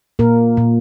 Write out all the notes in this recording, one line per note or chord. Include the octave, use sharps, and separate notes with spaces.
A#2 A#3 A#4
A#2